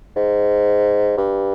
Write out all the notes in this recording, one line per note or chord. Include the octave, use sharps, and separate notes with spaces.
G#2
G2